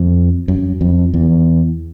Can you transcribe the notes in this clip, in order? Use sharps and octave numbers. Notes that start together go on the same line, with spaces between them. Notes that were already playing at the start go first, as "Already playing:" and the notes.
Already playing: F2
F#2
F2
E2